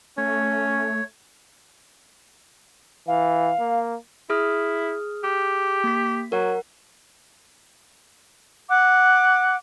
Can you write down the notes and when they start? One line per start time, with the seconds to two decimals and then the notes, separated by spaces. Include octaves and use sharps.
0.18 A3 C#4 C#5
3.08 E3 F5
3.59 A#3
4.30 E4 G#4 D#6 F6
5.24 G4
5.84 A#3 B6
6.32 F#3 A#4 F#5
8.69 F#5 D6